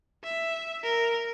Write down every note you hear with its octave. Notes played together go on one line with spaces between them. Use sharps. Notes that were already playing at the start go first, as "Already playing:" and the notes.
E5
A#4